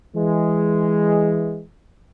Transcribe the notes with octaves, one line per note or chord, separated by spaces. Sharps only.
E3 G#3